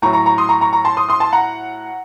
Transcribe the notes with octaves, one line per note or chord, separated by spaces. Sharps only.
A2 F#3 A#5 C#6
A#5 C#6
A#5 C#6
C6 D#6
A#5 C#6
A#5 C#6
A#5 C#6
A5 C6
C6 D#6
C6 D#6
A5 C6
F#5 A#5